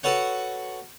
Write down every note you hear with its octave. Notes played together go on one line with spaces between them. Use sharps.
F#4 A4 B4 C#5 F#5